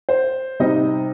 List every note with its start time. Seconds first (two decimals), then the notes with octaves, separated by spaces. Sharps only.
0.09 C5
0.60 C3 G3 D#4 D#5